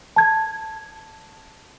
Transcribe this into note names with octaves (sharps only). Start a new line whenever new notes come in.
A5 G#6